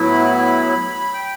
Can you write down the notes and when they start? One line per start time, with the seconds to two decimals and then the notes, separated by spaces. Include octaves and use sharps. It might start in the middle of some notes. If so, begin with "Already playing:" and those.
Already playing: A2 F#3 B3 E4 B5
1.13 G5